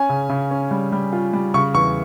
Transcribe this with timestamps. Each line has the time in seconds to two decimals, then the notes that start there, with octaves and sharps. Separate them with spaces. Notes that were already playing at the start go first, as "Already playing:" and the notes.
Already playing: C#4 G#5
0.09 C#3
0.29 C#3
0.51 C#4
0.71 G3
0.92 G3
1.12 F4
1.33 G3
1.54 C#3 C#6
1.74 E2 C#6